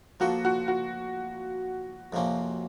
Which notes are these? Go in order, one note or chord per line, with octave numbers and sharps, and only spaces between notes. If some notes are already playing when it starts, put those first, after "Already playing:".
F3 A#3 F4 F#4 A4
F#4
F#4
F2 C3 F3 A#3 C#4